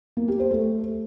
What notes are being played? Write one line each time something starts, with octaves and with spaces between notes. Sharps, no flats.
A#3
G4
C5
A3